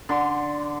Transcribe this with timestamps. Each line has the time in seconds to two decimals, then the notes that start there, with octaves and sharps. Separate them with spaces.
0.09 D3 C6